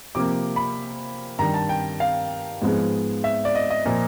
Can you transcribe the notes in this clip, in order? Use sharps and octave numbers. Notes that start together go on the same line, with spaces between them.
C3 F3 A#3 D6
B5
G2 D#3 G3 A#5
A5
G5
F5
G#2 F3 G#3 B3
E5
D5
D#5
D#5
A#2 F3 A#3